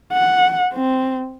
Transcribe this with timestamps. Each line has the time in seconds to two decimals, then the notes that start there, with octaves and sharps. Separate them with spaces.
0.13 F#5
0.73 C4